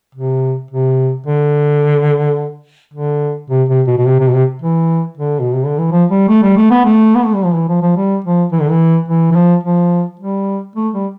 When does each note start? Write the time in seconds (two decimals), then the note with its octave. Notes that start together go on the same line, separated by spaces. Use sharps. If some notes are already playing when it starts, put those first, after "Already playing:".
0.15 C3
0.71 C3
1.27 D3
2.94 D3
3.50 C3
3.69 C3
3.87 B2
3.98 B2
4.06 C3
4.20 C3
4.28 B2
4.34 C3
4.62 E3
5.18 D3
5.40 B2
5.53 C3
5.66 D3
5.79 E3
5.92 F3
6.11 G3
6.29 A3
6.43 G3
6.57 A3
6.71 B3
6.85 A3
7.15 B3
7.25 A3
7.35 G3
7.45 F3
7.55 E3
7.68 F3
7.82 F3
7.96 G3
8.25 F3
8.52 E3
8.61 D3
8.70 E3
9.08 E3
9.31 E3
9.36 F3
9.63 F3
10.20 G3
10.75 A3
10.94 G3